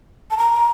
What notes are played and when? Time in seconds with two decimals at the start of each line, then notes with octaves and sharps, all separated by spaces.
0.31 A5
0.37 A#5